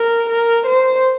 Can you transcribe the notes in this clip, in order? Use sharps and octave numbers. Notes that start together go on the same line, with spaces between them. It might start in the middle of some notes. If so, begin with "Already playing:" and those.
Already playing: A#4
A#4
C5